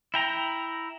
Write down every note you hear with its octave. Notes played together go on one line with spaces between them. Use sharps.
E4 G5 A#5